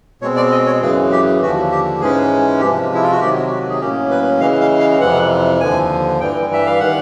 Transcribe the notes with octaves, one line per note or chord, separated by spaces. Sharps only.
B2 G#3 C4 C#5
D5
D#5
C#5
F#2 C#3 E3 G#4
G4
D#2 D3 F3 F#4
G4
G#2 E3 G#3 C#4 G#4
C3 F3 G#3 G4
E4
F4
F#4
C3 D#3 F#3 G4
F#4
G#4
A2 F#3 A#3 C#4 G4
B4
C#3 E3 G#3 F5
F5
F5
F2 C3 E3 F#5
D#2 D3 F3 G#5
G2 E3 G3 G5
E5
F5
D#3 G3 F#5